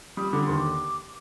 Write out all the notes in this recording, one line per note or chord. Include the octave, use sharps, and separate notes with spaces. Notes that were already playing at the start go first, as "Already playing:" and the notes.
G3 D#6
D3 D6
D#2 C6
D6